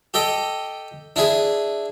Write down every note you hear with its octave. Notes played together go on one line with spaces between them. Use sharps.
G4 A4 D#5 G5
D4 E4 G#4